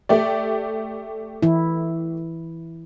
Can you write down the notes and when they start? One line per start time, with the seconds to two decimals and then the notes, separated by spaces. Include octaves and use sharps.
0.09 A3 G4 D5
1.43 E3 E4